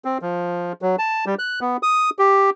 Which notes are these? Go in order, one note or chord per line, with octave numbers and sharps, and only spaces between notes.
C4
F3
F#3
A5
G3
F#6
B3
D#6
G4